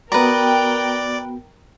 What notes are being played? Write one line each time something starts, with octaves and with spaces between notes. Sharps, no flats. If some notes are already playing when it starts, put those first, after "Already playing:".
B3 F#4 A#4 B4 D5 G5 A#5